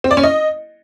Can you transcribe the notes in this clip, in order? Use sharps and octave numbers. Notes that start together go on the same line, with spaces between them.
C4
D5
C#4
D#5